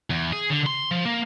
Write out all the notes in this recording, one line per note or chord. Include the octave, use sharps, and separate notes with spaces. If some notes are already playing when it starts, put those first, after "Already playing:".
E2
G#4
D3
C6
F3
A#3